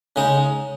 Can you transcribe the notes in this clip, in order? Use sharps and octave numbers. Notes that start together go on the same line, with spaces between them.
C#3 G#3 D#4